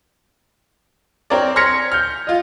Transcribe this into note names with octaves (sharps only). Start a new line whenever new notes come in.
C4 A#4 C#5 D5
C6 F6 G#6 A#6 B6 C#7
F6 G6
F4 D#5